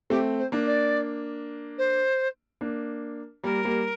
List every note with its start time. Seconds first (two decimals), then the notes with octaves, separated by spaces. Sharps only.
0.10 A3 C4 G4
0.38 C5
0.52 A#3 D4
0.67 D5
1.78 C5
2.61 A#3 D4
3.43 G3 A#3 A#4
3.65 G3 A#3